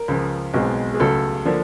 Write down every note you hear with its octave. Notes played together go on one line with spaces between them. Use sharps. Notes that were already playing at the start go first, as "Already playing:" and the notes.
Already playing: A#4
C#2 C#3 F3
B1 B2 G#3 C4
G#4
C#2 C#3 F#3 A3 A4
D3 F3 A#3 D4